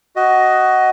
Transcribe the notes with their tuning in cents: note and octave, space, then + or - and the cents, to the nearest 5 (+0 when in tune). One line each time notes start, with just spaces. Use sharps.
F#4 +15 D#5 +5